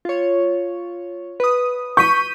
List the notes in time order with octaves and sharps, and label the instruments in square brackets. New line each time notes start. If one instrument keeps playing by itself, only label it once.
[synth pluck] F4 C#5
B4 D#6
[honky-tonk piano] C#6 [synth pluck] G6 B6 D#7